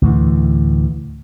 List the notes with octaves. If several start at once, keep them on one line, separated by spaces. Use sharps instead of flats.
D2 A2 E3